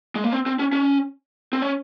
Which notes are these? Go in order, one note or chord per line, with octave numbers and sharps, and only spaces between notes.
G#3
A#3
C4
C4
C#4
C#4
C4
C#4